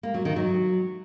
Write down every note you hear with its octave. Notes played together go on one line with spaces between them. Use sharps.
A#3
F#3
D#3
F#3